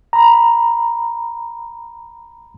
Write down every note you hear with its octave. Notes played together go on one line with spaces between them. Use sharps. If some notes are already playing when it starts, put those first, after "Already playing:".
A#5 B5